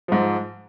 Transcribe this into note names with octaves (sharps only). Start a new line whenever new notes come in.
G#2 F3